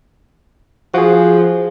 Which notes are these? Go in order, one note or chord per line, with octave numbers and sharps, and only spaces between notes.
F3 F#4 G#4